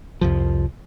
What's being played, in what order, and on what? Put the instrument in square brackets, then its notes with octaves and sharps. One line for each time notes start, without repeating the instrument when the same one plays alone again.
[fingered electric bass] C2 F2 F3